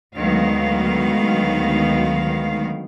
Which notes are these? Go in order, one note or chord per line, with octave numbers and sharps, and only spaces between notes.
D2 D#3 F#3 G#3 B3 F5